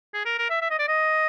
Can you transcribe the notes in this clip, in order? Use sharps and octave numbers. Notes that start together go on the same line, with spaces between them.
G#4
A#4
A#4
E5
E5
D#5
D5
D#5